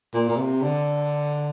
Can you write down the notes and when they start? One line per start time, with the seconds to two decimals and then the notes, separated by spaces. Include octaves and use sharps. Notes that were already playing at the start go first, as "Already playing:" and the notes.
0.14 A#2
0.28 A#2
0.37 C3
0.62 D3